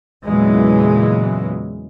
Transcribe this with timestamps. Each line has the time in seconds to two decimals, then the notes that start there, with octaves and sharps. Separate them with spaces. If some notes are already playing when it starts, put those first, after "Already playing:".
0.24 E2 A#2 C#3 E3 F#3 G#3